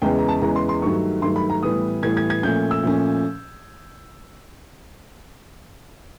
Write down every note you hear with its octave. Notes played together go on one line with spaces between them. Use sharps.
E2 C#3 E3 G#3 B3 G5
A#5
A5
E2 C#3 E3 G#3 B3 A#5
C6
C6
G2 D#3 F#3 A3 C#6
G2 D#3 F#3 A3 C6
B5
A#5
A2 E3 G3 B3 D#6
A2 E3 G3 B3 G#6
G#6
G#6
A#2 F3 A3 C#4 G6
E6
A#2 F3 A3 C#4